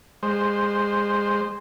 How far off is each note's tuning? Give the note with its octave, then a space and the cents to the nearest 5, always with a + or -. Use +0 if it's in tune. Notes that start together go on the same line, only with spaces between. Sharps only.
G#3 -25 C5 +0